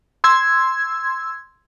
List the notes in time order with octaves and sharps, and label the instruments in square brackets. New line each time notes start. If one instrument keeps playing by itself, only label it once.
[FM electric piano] C6 E6 G#6